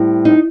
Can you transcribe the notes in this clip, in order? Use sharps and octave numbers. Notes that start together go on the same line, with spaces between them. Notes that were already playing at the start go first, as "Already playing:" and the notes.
Already playing: A2 G3 C4
D#4